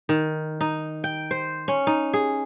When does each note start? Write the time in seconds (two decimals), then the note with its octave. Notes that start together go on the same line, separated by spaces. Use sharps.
0.09 D#3
0.61 D#4
1.04 G5
1.31 C5
1.68 C#4
1.87 D#4
2.14 G#4